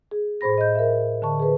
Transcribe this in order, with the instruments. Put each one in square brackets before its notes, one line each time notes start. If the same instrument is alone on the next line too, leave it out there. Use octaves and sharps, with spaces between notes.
[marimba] G#4
A2 G#4 C5 B5 A#6
D#5 G6
A#4 E5
D3 A5 C#6
G#4 B4